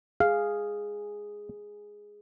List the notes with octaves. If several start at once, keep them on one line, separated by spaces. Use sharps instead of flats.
G#4 F5